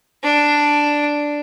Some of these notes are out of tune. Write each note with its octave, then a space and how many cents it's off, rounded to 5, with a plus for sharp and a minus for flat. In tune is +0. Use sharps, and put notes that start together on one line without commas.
D4 +0